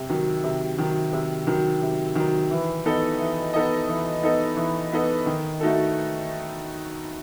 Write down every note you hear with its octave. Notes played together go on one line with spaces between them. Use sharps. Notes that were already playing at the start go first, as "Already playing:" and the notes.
Already playing: C3
D#3 F#3
C3
D#3 F#3
C3
D#3 F#3
C3
D#3 F#3
E3
B3 D#4 A4 D#5
E3
B3 D#4 A4 D#5
E3
B3 D#4 A4 D#5
E3
B3 D#4 A4 D#5
D#3
A3 D#4 F#4 A4